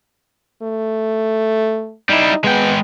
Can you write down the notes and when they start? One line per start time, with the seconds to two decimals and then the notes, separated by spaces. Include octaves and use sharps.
0.62 A3
2.09 G3 D#4 E4
2.44 G#3 B3 G5